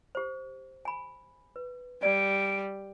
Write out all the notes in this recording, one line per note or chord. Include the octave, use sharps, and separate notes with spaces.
G4 C5
G#5 B5
B4
G3 D5 D7